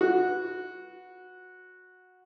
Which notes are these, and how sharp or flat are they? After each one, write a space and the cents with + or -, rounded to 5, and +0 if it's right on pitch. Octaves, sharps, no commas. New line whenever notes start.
F#4 -15 B4 +0